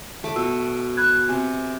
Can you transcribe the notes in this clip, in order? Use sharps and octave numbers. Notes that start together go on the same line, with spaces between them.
A3 D6
B2 E6
B5 F#6 G#6
C3 G#5